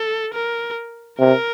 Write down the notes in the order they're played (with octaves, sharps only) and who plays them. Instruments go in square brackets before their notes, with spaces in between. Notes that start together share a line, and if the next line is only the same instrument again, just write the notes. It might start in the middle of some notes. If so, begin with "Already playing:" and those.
Already playing: [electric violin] A4
A#4
[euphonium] C3 [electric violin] A#4